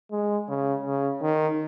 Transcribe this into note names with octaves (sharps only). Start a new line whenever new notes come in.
G#3
C#3
C#3
D#3